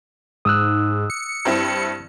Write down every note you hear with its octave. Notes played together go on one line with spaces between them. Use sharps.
G#2 D#6 E6 F#6
C#7
G2 C4 E4